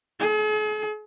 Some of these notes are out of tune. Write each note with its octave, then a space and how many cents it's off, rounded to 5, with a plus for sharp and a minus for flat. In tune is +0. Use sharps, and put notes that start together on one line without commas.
G#4 +45